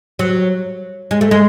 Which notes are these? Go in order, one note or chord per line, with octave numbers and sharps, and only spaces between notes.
F#3
G#3
A3
G#3